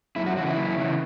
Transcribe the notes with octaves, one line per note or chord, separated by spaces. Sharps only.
F#2 E4
F#4
C#3 E3 F#4
E4
F#2
C#3 E3